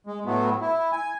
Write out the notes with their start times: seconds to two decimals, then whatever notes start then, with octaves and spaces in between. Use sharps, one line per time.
0.07 G#3
0.26 A2 F#3 A3 B3
0.61 E4
0.92 G#5